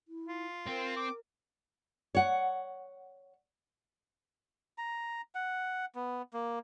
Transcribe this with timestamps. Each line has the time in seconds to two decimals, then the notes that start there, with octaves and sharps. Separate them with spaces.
0.08 E4
0.28 F4
0.67 C4 A#4
0.97 D6
2.15 C#5 F#5
4.78 A#5
5.35 F#5
5.95 B3
6.34 A#3